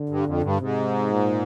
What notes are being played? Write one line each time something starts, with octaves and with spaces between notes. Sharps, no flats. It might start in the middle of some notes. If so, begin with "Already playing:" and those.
Already playing: D3
G2
F2
G2
G#2 C3
A#2